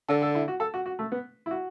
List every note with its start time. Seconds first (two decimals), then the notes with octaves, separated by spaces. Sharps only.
0.09 D3 A4
0.22 A4
0.35 E4
0.48 F#4
0.60 A4
0.74 F#4
0.86 F#4
0.99 A3
1.12 B3
1.46 E4
1.51 F#4